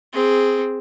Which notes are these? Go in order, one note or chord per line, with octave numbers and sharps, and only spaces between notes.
C4 G#4